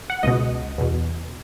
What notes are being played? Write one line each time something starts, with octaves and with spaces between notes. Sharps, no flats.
F#5
C#2 B2 D#5
E2 B2